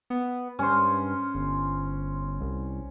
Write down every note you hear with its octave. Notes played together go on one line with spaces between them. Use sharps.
B3
G2 C#4 C5
G1
C2